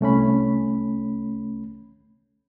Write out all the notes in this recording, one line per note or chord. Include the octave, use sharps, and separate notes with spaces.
C2 A3 C#4 B5